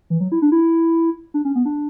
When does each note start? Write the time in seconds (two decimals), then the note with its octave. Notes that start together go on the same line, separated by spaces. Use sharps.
0.10 E3
0.20 F#3
0.32 E4
0.42 D4
0.52 E4
1.34 D4
1.45 C#4
1.55 B3
1.65 D4